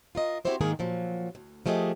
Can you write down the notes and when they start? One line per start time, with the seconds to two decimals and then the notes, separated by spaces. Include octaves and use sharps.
0.15 F4 A#4 D#5
0.45 C4 E4 F#4 G4 C5 E5
0.61 G#2 D#3 G#3 A#3 D#4 G#4
0.79 A#2 F3 F#3
1.35 D2
1.66 F3 A3 G4 G#4 D#5